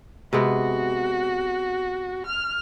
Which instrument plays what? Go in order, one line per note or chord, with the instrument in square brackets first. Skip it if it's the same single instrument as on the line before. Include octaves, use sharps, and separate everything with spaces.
[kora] C3 G#3 B3 [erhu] F#4
[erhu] F6